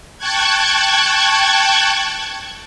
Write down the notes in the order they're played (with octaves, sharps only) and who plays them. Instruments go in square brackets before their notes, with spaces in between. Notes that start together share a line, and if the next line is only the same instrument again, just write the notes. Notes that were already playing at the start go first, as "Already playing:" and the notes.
[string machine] G5 A5 C#6 F#6 G#6